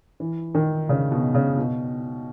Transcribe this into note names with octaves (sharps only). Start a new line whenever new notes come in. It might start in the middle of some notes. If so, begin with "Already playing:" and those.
E3
D#3
C#3
B2
C#3
B2